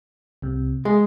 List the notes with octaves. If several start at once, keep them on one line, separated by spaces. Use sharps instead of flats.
C2 C3
G#3 G#4